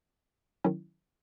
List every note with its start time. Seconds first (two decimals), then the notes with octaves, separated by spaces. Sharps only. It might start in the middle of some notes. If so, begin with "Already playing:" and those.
0.64 D#3 F#3 C#4 E4